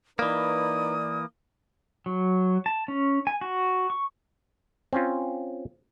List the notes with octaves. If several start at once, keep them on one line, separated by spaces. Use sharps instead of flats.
E3 A#3 D#4 B4 D5 D#6
F#3
A5
C#4
G#5
F#4
C#6
C4 C#4 F4